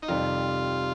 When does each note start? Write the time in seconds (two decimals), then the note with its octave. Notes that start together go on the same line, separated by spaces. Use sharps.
0.02 D#4
0.08 F2 C3 D#3 G3 F4